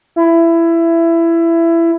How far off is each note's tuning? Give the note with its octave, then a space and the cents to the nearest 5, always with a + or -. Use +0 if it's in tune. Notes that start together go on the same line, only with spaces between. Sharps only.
E4 +20